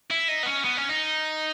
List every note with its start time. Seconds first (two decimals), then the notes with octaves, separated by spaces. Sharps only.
0.11 E4
0.28 D#4
0.43 B3
0.46 C#4
0.64 B3
0.77 C#4
0.89 D#4